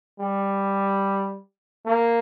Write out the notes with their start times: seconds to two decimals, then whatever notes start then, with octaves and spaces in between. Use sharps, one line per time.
0.20 G3
1.86 A#3